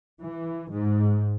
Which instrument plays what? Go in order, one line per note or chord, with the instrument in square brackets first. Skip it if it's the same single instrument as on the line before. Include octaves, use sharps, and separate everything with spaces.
[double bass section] E3
G#2